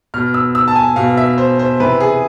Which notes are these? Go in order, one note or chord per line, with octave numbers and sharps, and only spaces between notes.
B2 F6
E6
E6
A5
G#5
B2 F5
E5
C5
C5
C3 E3 B4
G#4